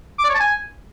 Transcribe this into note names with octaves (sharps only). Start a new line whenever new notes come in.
D6
D5
C#5
A5
G#5